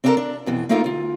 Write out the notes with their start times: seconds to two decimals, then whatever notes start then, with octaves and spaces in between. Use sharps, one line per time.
0.04 C4 D4 E4 F#4 A4 A#4
0.17 D4
0.46 F2 B2 E3
0.69 A3 A#3 D#4 F4 A4 A#4
0.84 D2 F4